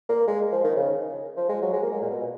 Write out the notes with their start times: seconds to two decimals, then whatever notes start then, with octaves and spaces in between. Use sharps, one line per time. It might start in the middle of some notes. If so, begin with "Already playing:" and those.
0.09 A#3
0.27 G#3
0.52 F3
0.64 D#3
0.76 C#3
1.37 F3
1.49 G#3
1.62 F#3
1.73 G#3
1.83 A#3
1.92 G#3
2.01 A#2
2.10 B2